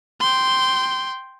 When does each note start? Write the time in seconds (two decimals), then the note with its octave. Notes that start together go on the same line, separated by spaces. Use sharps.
0.20 G5 C6